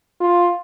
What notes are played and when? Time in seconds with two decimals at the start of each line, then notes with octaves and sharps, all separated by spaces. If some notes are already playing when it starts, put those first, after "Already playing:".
0.21 F4